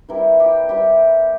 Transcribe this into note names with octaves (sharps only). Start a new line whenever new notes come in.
E3 G3 C4 E4 A#4
G4
E3 G3 C4 E4 G4